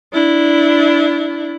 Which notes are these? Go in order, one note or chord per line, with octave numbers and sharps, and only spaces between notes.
D4 E4